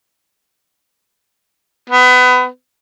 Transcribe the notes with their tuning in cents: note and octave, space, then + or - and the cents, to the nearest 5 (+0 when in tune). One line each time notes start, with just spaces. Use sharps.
B3 +25